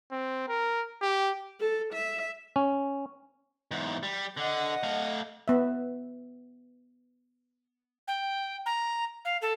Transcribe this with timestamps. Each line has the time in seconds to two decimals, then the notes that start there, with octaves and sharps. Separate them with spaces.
0.11 C4
0.48 A#4
1.02 G4
1.60 A4
1.93 E5
2.56 C#4
3.71 E2 G#2
4.03 G3
4.37 D3 D#5 F#5
4.83 A3 F5
5.48 B3 E5
8.08 G5
8.66 A#5
9.25 F5
9.42 A4